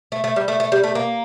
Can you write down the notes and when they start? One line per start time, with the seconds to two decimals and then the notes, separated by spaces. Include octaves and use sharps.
0.12 A3
0.24 A3
0.36 G3
0.48 A3
0.60 A3
0.72 G3
0.84 A3
0.95 A#3